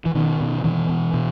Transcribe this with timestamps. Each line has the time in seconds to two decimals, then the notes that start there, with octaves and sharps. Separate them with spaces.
0.06 E3
0.15 B2 D#3
0.40 B2
0.64 B2 E3
0.89 B2
1.14 B2